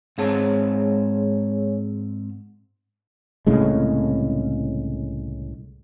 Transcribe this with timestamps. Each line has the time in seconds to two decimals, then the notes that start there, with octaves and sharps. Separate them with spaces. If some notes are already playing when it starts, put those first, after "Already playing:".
0.18 G#2 G#3 C4 G#4 C#5 A5
3.47 C2 A2 C#3 G#3